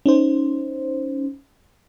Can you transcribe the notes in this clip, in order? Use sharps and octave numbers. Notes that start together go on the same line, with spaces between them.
C#4 D#4 C5